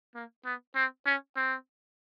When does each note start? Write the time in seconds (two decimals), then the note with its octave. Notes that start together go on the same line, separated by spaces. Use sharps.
0.15 A#3
0.45 B3
0.76 C4
1.06 C#4
1.36 C4